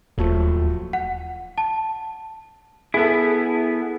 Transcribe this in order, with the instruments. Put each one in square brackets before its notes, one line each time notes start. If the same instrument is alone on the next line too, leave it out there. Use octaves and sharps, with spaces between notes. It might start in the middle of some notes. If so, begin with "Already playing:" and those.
[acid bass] D1 [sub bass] D#2 [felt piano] F3 F#3 A3
[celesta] F#5
A5
[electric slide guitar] B3 E4 [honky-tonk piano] G#4 A4